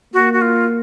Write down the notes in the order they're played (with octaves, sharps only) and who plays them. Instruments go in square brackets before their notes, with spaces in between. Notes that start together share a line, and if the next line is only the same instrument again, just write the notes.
[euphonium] A#3 [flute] F#4
[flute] F#4
F4